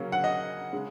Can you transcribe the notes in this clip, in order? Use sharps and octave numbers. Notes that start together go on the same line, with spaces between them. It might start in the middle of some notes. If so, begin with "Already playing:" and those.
Already playing: C#3 F#3 A#3 C#4
F#5
D#5
C#3 G#3